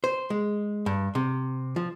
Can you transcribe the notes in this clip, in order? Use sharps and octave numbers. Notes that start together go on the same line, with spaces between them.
C5
G#3
G2
C3
F3